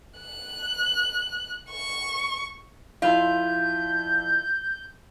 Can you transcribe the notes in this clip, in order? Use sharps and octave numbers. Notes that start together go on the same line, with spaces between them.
F#6
C#6
F2 E4 F4 G6